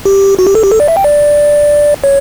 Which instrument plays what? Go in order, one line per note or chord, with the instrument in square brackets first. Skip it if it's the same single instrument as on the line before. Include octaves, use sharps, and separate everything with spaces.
[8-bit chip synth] G4
F#4
G4
A4
G4
A4
D5
E5
G5
D5
C#5